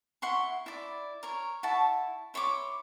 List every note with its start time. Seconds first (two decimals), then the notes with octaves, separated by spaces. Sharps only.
0.22 E4 F#5 C6 C#6
0.66 E4 D5
1.23 A#4 C#5
1.63 E4 F#5 A5 C#6
2.34 E4 C#5 C6 D6